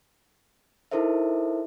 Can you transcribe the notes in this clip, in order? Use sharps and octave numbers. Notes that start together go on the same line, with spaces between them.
D#4 E4 A4 A#4 C5 E5